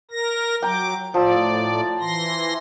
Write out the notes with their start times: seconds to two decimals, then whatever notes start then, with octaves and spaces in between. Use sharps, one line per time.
0.11 A#4 A#6
0.62 F#3 G5 A#5 D6
1.14 A2 F3 D5 E6
2.00 E3 C6 A#6